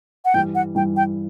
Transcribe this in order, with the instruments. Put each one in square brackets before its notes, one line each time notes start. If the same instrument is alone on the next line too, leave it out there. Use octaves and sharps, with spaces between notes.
[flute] F#5
[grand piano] G2 E3 G3 [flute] G5
[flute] F#5
[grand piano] G2 E3 G3 [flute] G5
[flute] G5